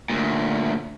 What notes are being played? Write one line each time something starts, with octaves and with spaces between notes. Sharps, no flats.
D2 A#2